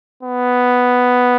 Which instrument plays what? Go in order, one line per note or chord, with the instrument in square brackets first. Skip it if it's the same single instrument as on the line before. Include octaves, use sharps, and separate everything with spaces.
[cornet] B3